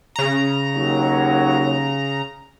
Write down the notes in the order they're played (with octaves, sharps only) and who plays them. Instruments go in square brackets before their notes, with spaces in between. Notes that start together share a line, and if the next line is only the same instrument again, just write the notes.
[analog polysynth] C#3 A#5
[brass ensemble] D#2 F#3